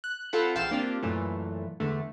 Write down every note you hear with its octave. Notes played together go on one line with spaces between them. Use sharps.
F#6
C4 F4 A4 F#5 B5
A#1 E2 F5 G5 A5 E7
A#3 C4 D4 F4 G4
F#2 A#2 E3 A3
E2 D3 A3